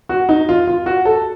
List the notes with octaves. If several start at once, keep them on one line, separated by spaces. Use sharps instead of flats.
F#4
D#4
F4
F4
F#4
A4